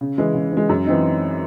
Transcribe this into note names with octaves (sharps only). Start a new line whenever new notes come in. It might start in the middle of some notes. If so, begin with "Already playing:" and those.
C#3
E3 G#3
C#3
E3 G#3
F#2
E3 C4 D#4